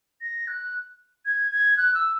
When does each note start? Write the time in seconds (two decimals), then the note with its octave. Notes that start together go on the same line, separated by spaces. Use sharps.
0.21 A#6
0.47 F#6
1.25 G#6
1.52 G#6
1.77 F#6
1.94 E6